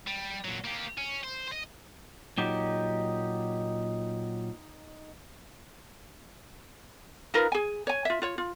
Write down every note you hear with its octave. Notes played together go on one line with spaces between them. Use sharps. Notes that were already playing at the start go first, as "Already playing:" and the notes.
G3
A#2 F#3
A#3 G4
C#4
C5
C5 D#5
A#2 F#3 D#4 G4
D#4 F4 A#4 B4
G#4 G#5
C#5 G#5
F4 E5
F4 C#5
F4